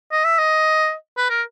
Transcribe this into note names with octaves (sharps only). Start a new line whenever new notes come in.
D#5
E5
D#5
B4
A#4